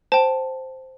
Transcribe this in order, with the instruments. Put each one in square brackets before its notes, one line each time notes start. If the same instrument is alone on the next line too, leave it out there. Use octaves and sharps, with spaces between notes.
[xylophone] C5 G5 A5